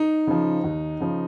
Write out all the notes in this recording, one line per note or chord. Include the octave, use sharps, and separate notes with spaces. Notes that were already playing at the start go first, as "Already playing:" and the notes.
Already playing: D#4
C#3 F3
D#2
C#3 F3